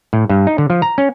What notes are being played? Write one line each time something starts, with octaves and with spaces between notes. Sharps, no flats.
A2
G2
D#4
D3
F3
A#5
C#4